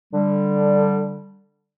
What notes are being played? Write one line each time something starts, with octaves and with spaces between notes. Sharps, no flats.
D3 G3